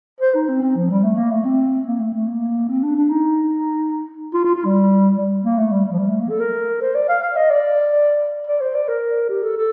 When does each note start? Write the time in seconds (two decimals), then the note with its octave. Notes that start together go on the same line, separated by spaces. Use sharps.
0.21 C5
0.35 D#4
0.48 C4
0.62 C4
0.76 F3
0.90 G3
1.04 A3
1.17 A#3
1.31 A3
1.45 C4
1.86 A#3
1.99 A3
2.14 A3
2.27 A#3
2.69 C4
2.83 D4
2.96 D4
3.10 D#4
4.33 F4
4.44 F4
4.55 F4
4.65 G3
5.16 G3
5.44 A#3
5.58 A3
5.71 G3
5.86 G3
5.92 F3
5.99 G3
6.09 A3
6.20 A#3
6.30 A4
6.40 A#4
6.81 C5
6.95 D5
7.09 F5
7.22 F5
7.36 D#5
7.50 D5
8.47 D5
8.61 C5
8.75 D5
8.88 A#4
9.30 G4
9.43 A4
9.57 A4